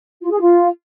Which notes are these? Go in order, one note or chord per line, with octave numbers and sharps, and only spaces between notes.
F4
G#4
F4